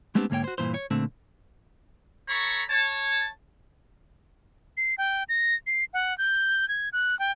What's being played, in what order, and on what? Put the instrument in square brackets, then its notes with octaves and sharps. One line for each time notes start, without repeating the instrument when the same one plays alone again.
[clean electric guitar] G#3 A3 B3 C4 D4 G4
D2 G#2 A#3 C#5 G5
F#4 C5
G2 A#2 E3 C5
C#5
A#2 D3 A3 C4
[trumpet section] A4 C#5 A#5 B5 C#6
C#5 A5
[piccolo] C7
G5
A#6
C7
F#5
G6
G#6
F#6
G5